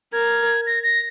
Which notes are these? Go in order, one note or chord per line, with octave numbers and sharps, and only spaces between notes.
A#4 G#6
A#6
A#6